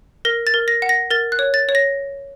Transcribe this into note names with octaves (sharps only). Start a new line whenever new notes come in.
A#4 A#6
A6
A#4
A#6
F#5
A#6
A#4 A6
F#6
C#5
A6
C#5
A#6